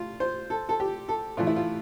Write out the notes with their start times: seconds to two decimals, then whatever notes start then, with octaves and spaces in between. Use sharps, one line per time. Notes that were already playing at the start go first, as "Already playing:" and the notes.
Already playing: A3 F4
0.20 C5
0.50 A4
0.69 A4
0.80 G4
1.09 A4
1.37 A2 E3 A3 F4
1.47 E4
1.56 F4